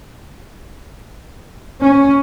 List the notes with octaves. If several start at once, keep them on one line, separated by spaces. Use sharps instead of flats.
C#4